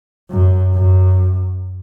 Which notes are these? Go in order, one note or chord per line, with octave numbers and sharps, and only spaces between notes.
F#2
F#2